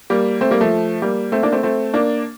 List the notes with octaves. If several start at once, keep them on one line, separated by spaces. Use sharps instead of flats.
G3 A#3
A3 C4
G3 A#3
F3 A3
G3 A#3
A3 C4
A#3 D4
A3 C4
A3 C4
A#3 D4